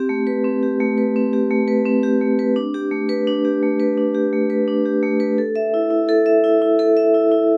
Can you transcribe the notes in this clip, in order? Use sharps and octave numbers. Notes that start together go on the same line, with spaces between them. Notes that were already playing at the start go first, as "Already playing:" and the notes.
Already playing: C4 G4
A3
B4
C4
G4
A3
B4
C4
G4
A3
B4
C4
G4
A3
B4
D4
G4
A3
B4
D4
G4
A3
B4
D4
G4
A3
B4
D4
G4
A3
B4
A4
E5
E4
E4
A4
E5
E4
E4
A4
E5
E4
E4